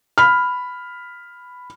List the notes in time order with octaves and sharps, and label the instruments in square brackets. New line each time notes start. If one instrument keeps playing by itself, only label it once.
[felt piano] B5 F6